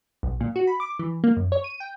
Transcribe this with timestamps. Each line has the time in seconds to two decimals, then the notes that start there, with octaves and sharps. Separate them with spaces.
0.23 B1
0.41 A#2
0.56 F#4
0.67 B5
0.80 D6
0.99 E3
1.24 A#3
1.37 F#2
1.52 C#5
1.64 D#7
1.80 G5